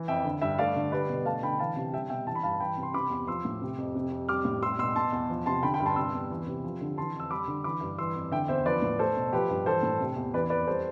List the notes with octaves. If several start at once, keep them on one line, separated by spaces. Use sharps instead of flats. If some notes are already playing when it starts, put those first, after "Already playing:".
Already playing: E3
F2 E5 G5
D3
G2 E5 G5
A3 D5 F5
D3
G3 B4 D5
B2
A3 F5 A5
D3 G5 B5
E3 F5 A5
C3
G3 E5 G5
B2 E5 G5
E3 A5
B5
G2 F5 A5
E3 G5 B5
C3
C6
C3 B5 D6
E2
F3 C6 E6
A2
C3
F2
C3
F2
G3 D6 F6
A2
G3 C6 E6
B2 C6 E6
B2 A5 C6
E2
F3
C3 A5 C6
D3 G5 B5
G5 B5
G2
A5 C6
C3 C6 E6
E2
E3
C3
F3
D3
E3 A5 C6
F2
E6
G3 B5 D6
D3
E3 B5 D6
G2
E3 C6 E6
F2
D3 E5 G5
E2 C5 E5
F3 B4 D5
A2
A3 A4 C5
B2
F3 G4 B4
G2
E3 A4 C5
A2
C3
E2
E3 B4 D5
F2 B4 D5
G3 A4 C5